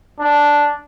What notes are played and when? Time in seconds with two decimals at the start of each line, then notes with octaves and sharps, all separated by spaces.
0.20 D4